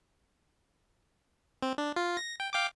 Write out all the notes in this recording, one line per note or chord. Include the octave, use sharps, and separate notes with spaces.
C4
D4
F4
A#6
G5
F5 G5 D6